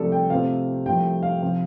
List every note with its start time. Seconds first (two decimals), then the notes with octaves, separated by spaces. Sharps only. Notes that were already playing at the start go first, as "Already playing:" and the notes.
Already playing: C2 C3 F3 A3 A4 D5
0.12 G5
0.30 C3 A3 C4 F4 F5
0.86 C2 C3 F3 A3 G5
1.23 F5
1.42 C3 F3